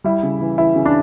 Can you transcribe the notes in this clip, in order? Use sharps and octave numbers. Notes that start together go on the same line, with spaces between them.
G3 E4
C#3
E3
E3 E4
C#3
D4